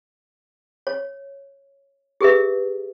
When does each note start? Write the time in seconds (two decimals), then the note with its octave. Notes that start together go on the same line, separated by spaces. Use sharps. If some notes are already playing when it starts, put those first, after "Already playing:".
0.87 C#5
2.21 G4 G#4 A#4 B4 E5